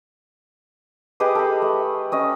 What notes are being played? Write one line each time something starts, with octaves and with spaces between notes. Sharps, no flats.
G4 G#4 B4 D#5
A4 B5
A3
C#4 D#5